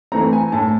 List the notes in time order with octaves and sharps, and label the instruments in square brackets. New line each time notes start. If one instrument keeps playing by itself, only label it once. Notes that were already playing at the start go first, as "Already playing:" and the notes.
[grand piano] E3 A3 C4 A#5
G#5
A2 A5